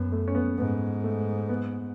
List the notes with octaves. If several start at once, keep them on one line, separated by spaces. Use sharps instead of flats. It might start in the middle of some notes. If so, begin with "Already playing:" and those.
Already playing: F#2 B3
A3
C#4
B3
G#2 B3
A3
B3